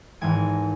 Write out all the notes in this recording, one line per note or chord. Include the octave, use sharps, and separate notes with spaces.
G#1 G#2 E3 G#3 G#5